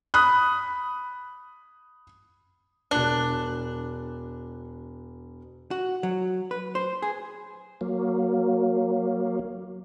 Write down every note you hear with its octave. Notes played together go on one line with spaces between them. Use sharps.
B5 D#6 F#6
E1 D4 F#6
F#4
F#3
B4
C5
G#4
F#3 A#3